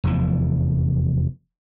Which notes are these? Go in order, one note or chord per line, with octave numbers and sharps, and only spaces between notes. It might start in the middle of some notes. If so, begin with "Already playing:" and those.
F1 E2 E3 F3